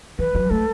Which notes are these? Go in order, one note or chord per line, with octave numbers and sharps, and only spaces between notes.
E3 B4
F#3
A3 A4